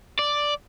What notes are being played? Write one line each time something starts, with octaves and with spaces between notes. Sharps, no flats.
D5